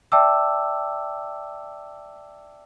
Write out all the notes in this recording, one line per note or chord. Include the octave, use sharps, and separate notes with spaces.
D5 E5 G5 A5 D6 E6